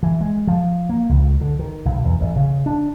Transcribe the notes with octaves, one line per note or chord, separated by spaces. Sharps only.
E3
G#3
F3
A#3
C#2
D3
D#3
B1
E2
A1
C#3
D4